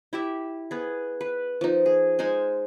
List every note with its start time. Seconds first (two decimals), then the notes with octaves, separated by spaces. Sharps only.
0.13 E4 G4 E5
0.71 B3 G#4
1.21 B4
1.61 F3 D#4
1.86 G#4
2.19 G#3 D#4 C5 G#5